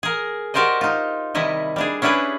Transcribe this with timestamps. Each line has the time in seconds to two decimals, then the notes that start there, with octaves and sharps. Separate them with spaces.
0.03 G#4 A#4
0.54 F#4 G4 A#4 C5 D5 D#5
0.81 D#4 F4
1.35 C3 D#3 G3 E4 D#5
1.76 G3 D4 G#4
2.02 C#4 D4 E4 G4 G#4 B4